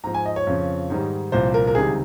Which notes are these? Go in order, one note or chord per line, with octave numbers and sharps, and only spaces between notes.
G#2 F3 A#5
G#5
D#5
C#5
F2 C#3 F3
G#2 D#3 G3
C2 A#2 F3 C5
A#4
A#4
C#2 C3 D#3 G3 G#4